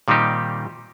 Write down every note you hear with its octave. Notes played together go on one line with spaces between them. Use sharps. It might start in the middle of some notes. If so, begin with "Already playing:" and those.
A#2 D#3 G3 C4 D#4 G4